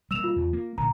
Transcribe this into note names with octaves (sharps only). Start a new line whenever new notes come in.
G3 A#3 E6 E7 F7
F4
E2
A#3
A#1 A2 D3 A#5